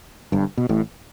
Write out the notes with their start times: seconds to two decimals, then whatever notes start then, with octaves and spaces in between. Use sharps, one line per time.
0.32 G1 G2
0.57 B2
0.69 A1 A2